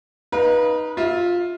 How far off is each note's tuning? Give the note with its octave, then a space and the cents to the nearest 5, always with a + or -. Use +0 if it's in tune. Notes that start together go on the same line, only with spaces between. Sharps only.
D#4 +0 B4 -25 F5 +0
F4 +10 E5 -15